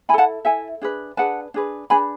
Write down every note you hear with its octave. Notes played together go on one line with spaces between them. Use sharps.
E4 A4 F#5 G#5 A5 B5
E4 A4 E5 G#5
D4 G#4 B4
D4 G#4 B4 F#5 A5
D4 G#4 B4
D4 G#4 B4 G#5 B5